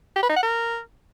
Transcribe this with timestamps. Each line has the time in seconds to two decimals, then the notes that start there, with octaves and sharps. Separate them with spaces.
0.16 G4
0.23 B4
0.29 D#4
0.36 F#5
0.43 A#4